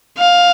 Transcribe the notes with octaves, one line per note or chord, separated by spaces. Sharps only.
F5